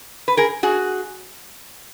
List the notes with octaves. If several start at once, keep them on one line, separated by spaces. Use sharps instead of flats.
B4
G#4 A#4
F#4 G#4